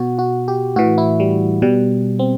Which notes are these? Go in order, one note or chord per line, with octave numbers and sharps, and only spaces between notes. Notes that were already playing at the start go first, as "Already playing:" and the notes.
Already playing: B2 F#4
F#4
G4
A2 E3 F#4
E4
G3
B2 G3
C4